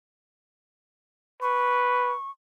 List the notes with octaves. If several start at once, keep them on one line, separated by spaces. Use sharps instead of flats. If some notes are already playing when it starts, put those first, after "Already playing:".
B4 C#6